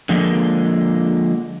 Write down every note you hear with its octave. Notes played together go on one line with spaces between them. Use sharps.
D3 F3 G#3 A#3